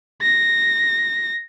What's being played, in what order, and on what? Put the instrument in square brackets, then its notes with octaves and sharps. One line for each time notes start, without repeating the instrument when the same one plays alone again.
[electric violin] A#6